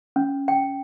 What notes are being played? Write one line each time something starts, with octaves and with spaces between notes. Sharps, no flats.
C#4
G5